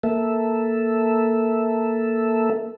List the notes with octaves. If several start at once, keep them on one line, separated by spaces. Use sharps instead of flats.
A#3 A4 E5